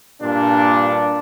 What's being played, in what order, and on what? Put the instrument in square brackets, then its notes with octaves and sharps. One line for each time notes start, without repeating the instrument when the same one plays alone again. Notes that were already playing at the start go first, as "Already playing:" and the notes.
[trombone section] G2 A#2 D4